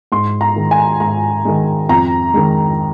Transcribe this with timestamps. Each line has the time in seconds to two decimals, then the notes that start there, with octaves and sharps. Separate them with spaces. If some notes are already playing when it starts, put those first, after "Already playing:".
0.12 G#2 C6
0.41 A#5
0.56 D#3 G#3
0.71 G#5
1.00 G#2 A#5
1.45 D#3 G#3
1.89 F2 A#5
2.34 D#3 G#3